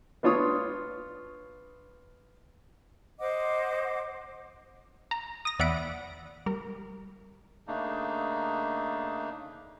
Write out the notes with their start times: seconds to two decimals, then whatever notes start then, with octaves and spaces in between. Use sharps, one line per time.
0.23 B3 D4 F4 C#5 C6 D#6
3.19 C5 D#5 F#5 D6
5.11 A#5
5.45 D#6 A#6
5.59 E2 D5 E5 F#5 B5 D7
6.46 G3 A#4
7.68 C#3 A3 A#3 D4 D#4